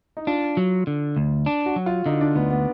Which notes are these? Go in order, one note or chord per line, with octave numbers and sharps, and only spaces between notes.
D#4
D4 F4
F#3
D3
D2
D4
F#4
F#3
F4
D3 D#4
D4
D2 B3
B3